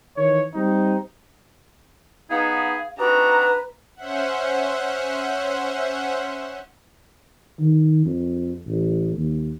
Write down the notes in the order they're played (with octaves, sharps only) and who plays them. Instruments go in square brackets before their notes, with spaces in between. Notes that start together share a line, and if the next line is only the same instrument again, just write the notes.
[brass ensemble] D#3 E3 C#5
G3 C4 D#4
[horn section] B3 D#4 [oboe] G#4 [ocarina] F5
[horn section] C4 D#4 F#4 [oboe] D4 [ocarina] B4 [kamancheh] A#5
[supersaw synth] C#4 C5 E5 F#5
[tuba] D#3
F2
A1
D#2